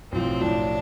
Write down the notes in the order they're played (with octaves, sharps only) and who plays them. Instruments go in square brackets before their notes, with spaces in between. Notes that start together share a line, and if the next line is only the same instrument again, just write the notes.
[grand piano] B1 A2 F3 [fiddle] C4
[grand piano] B1 A2 F3 [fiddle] D4